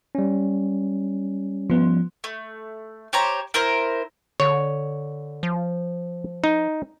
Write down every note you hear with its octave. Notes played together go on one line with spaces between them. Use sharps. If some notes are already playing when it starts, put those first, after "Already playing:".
G3 C#4
F3 B3
A3
G4 C5 C#5 A#5
E4 A#4 C5
D3 C#5
F3
D#4